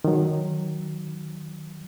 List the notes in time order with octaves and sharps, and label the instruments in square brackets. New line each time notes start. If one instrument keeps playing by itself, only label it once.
[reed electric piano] D#3 F#3